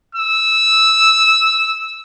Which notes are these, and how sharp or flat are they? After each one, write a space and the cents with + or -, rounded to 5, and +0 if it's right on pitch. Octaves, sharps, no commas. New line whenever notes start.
E6 -10